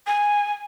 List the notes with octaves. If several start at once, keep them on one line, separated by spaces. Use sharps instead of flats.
G#5